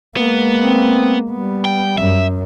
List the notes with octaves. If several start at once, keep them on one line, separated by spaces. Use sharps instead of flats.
G#3 A#3 B3
C4
G3 B3
G5
F#2 E5